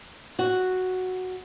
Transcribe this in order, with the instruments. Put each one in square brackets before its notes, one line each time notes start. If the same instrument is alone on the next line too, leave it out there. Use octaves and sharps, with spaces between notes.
[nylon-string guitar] F#4